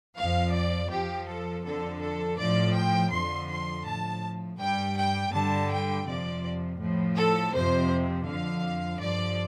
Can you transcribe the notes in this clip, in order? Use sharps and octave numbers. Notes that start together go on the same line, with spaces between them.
F2 F3 F5
D5
F2 F3 G4
A4
F2 D3 F3 A4
A4
A2 F3 D5
G5
F2 D3 F3 C6
C6
A2 F3 A5
G2 G3 G5
G5
G2 D3 G3 A5
G5
F2 C3 F3 D5
A2 F3
A4
F2 C3 F3 C5
F2 D3 F3 F5
G2 F3 D5